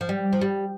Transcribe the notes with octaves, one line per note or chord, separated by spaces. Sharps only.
F3
G3
F3
G3